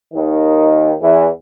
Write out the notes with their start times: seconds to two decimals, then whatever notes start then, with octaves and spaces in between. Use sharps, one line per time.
0.14 D#2 D#3
1.02 E2 E3